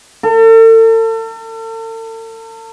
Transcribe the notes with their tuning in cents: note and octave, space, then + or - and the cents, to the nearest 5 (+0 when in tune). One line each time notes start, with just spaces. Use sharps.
A4 +40